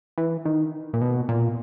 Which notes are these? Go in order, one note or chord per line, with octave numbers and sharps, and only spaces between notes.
E3
D#3
A#2
B2
A#2